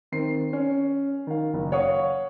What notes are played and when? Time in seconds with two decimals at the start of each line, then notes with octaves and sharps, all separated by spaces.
0.12 D#3 C4 C7
0.53 C#4
1.27 D#3 F5
1.54 F#1
1.72 C#5 F5 F#5 C#6 D#6